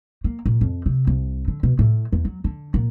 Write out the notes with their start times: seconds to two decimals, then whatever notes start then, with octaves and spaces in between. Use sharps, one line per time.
0.24 A#3
0.46 A#2
0.61 F2
0.86 C3
1.07 C2
1.48 D3
1.63 B2
1.79 A2
2.12 E2
2.25 F#3
2.44 D3
2.74 A#2